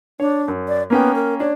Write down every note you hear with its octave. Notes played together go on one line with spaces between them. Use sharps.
D4 C#5
F#2
D5
A#3 B3 C#4 G5
A#4
D4 C#5